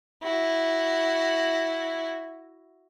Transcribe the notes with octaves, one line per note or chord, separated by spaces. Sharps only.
E4 F#4